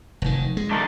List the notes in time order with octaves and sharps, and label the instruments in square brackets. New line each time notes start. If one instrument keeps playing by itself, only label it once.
[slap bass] F1 D#3
G#3
[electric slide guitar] D#3 A3 D4